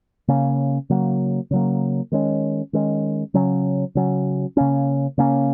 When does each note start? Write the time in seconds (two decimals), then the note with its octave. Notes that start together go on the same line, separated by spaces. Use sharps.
0.28 C#3 A#3 C#4
0.90 C#3 F#3 A#3
1.51 C#3 F#3 A#3
2.12 D#3 G#3 C#4
2.73 D#3 G#3 C#4
3.34 C#3 F#3 C#4
3.95 C#3 F#3 C#4
4.57 C#3 A#3 C#4
5.18 C#3 A#3 C#4